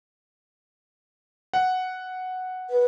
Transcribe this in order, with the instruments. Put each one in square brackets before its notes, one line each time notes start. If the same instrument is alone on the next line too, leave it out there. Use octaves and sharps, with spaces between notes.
[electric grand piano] F#5
[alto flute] B4